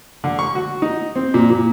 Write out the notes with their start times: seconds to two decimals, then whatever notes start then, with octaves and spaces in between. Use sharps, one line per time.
0.24 D3
0.39 C#6
0.55 F#4
0.82 D#4
1.16 C4
1.34 A#2
1.50 A#2